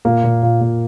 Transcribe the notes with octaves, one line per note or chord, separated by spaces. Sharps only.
A#2 A#3
A#2
A#2
A#2